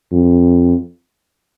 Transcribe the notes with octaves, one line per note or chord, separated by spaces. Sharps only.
F2